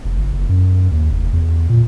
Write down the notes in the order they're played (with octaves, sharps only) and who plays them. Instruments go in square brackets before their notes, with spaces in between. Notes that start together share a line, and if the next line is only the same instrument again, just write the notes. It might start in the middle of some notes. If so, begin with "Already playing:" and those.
[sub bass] F1
G1
F#1
F#2
D#2
F1
E2
A#2